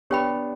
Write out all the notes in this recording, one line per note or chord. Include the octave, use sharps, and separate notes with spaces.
B3 D4 G4 C#5 G5 B5